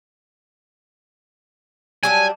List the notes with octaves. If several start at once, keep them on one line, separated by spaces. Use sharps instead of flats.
F#3 G3 D4 G#5